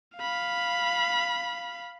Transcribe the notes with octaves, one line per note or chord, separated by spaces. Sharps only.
F5 B5